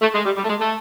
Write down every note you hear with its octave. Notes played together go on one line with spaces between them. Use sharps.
A3
G#3
G3
G3
A3
G#3
A3